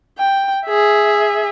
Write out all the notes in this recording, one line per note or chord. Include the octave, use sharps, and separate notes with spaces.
G5
G#4 E5